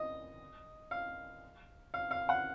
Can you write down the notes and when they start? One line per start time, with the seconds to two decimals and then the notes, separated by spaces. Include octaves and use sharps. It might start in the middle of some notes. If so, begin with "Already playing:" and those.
Already playing: D#5
0.91 F5
1.94 F5
2.11 F5
2.29 F#5